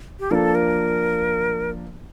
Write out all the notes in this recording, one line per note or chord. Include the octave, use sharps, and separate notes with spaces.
G4
F3 A#3 D4 A4 A#4
A#4